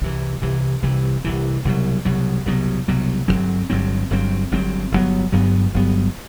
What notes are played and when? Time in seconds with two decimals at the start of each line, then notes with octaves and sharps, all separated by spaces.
0.01 C2 C3 E3
0.42 C2 C3 E3
0.82 C2 C3 E3
1.24 C2 C3 E3
1.65 C2 B2 F#3
2.05 C2 B2 F#3
2.46 C2 B2 F#3
2.88 C2 B2 F#3
3.28 G1 G2 F#3 C4
3.70 G1 G2 F#3 C4
4.10 G1 G2 F#3 C4
4.51 G1 G2 F#3 C4
4.92 G1 G2 F#3 B3
5.32 G1 G2 F#3 B3
5.74 G1 G2 F#3 B3